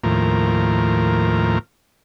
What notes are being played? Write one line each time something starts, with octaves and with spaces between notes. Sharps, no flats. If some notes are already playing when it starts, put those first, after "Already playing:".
D#2 A2 F3 A#4